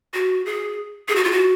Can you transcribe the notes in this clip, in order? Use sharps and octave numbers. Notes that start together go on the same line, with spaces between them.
F#4
G#4
G#4
F#4
F4
F#4